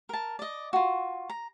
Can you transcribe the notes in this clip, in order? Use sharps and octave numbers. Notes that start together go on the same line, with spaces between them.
A#4 A5
D5 D#5
F4 F#4
A#5